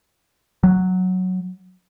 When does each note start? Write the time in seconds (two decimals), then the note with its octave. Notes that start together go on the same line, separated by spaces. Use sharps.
0.63 F#3